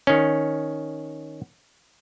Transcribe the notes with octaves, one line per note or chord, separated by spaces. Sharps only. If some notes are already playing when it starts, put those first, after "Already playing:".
D#3 C#4